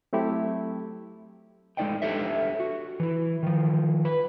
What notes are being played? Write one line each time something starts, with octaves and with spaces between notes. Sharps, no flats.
F#3 A3 C4 E4 G4
G#3 A3 D#4 D5 D#5 G5
D4 G4 A4 C#5 E5
F#4
E3 E4
D#3 F3
B4